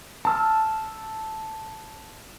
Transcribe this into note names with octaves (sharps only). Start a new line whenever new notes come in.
A5 E6 F6